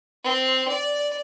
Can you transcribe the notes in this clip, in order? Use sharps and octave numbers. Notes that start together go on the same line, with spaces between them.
C4
D5